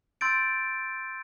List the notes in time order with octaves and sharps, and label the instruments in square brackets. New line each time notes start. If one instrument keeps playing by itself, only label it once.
[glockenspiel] C6 E6 G6 A6 D7